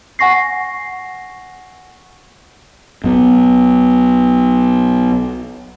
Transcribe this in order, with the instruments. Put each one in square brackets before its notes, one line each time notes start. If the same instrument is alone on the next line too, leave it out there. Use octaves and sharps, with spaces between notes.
[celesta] F#5 G#5 C#6 A#6 C7
[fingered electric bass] B1 B2